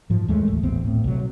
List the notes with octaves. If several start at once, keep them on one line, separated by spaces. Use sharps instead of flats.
G#2 F3
D#2 G#3 A3
A1
D#1 A1 B3 C4
A2
B1 C3 F#3